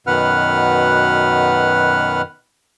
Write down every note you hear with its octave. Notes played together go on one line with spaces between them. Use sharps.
F#2 B2 D#3 B4 F#5 F6